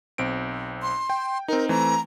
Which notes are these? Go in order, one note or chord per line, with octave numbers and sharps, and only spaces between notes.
B1 C4 D7
C6
G5
C4 D#4 A#4
E3 A3 C4 A#5